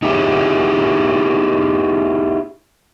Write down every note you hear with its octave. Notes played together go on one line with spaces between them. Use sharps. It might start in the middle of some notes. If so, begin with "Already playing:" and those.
D#4 E4 G4 G#4 B4 C#5